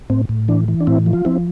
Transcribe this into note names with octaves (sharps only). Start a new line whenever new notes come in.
A2 C4
A2
E3 D4
E3
D4
A2 C4 E4
F3
F4
F3 C4 E4